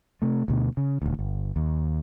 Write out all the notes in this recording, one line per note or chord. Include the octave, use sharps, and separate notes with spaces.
C3 A3
D2 B2
C#3
D#1 D2
G1
D#2